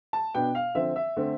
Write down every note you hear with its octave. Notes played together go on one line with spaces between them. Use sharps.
A5
B2 B3 D4 G5
F5
D3 F3 C4 E5
E5
D3 A3 C4